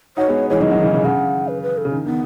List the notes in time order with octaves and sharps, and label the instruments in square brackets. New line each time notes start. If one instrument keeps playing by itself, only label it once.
[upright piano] D#4 F#4 [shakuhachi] C#5
[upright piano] G#3 B3
[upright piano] E3 G#3 [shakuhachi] C#5
[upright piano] D#3 F#3 [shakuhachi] D#5
[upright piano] D#3 F#3
C#3 E3
C#3
[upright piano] C#3 [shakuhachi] F#5
[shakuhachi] B4
B4
A4
[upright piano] C#3
[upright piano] D#3 [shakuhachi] C#4
[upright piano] D#3 [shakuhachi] B3